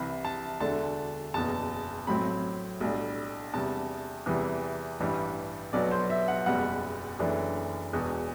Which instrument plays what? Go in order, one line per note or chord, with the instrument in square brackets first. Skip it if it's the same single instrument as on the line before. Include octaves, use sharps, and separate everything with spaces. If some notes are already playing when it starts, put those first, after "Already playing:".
Already playing: [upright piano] C2 C3 E3 B5
A5
E1 D2 D3 A3 D4 A5
F#1 E2 B2 A5
A1 A2 F#3 C4 B5
B1 A2 G3 D4
E2 C3 G3 A5
E2 C3 E3 G3
A1 G2 E3 G3
B1 B2 F#3 B3 D5
C5
E5
F#5
F#1 E2 B2 G3 F#5
F#1 F#2 E3 A3 D4
E1 E2 B2